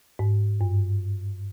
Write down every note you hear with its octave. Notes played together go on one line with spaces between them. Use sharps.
G#2
G2